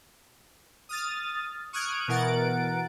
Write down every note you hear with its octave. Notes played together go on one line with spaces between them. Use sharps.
D#6 F6 A6
C#6 D#6 F6 F#6 G#6 D7
B2 E3 A#4 F#5 A6 D7